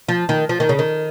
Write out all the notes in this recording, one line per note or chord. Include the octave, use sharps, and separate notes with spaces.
F3
D#3
F3
D#3
C#3
D#3